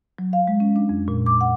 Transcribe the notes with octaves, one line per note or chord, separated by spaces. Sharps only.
F#3
F5
G#3
C#4
D4
F2
A#2
D6
F#5